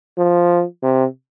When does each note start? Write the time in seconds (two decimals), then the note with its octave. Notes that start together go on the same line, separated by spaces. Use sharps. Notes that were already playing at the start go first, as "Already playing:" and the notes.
0.18 F3
0.83 C3